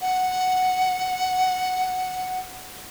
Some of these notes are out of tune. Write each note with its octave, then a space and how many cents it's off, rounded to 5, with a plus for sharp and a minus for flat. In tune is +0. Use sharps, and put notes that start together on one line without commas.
F#5 +0